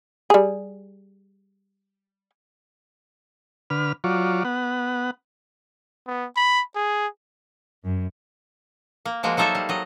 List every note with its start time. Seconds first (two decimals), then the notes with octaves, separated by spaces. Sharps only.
0.30 G3 G#4
3.70 D3 B4 F6
4.04 F#3 F4 C#5 D5
4.45 B3 F#5
6.07 B3
6.37 B5
6.76 G#4
7.84 F#2
9.05 A#3
9.23 F3 G#3 A#3 F#4
9.37 F#3 A#3 D#4 A4 C5 E5
9.55 G3
9.69 F#3 D#5